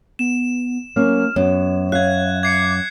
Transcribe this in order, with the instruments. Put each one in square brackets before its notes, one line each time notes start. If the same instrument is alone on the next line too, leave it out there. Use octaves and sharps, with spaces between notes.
[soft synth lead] B3 [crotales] E7
[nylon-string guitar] F#3 A#3 C#4 [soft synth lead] F6
[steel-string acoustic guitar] F#2 [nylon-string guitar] B3 [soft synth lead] C#5
[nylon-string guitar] E5 F5 [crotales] F#6 G#6
[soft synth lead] D6 [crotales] G#6 C7 C#7